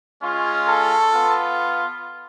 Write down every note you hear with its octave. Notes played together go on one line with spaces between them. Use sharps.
G#3 C#4 F4
A4
B3 F4